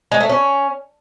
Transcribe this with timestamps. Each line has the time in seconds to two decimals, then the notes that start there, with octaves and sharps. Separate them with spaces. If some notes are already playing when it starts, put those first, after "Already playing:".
0.12 G#3
0.20 A3
0.29 C#4